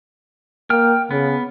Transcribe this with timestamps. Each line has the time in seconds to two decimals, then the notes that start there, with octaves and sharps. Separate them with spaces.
0.70 A#3 G5 F6
1.11 C#3 B3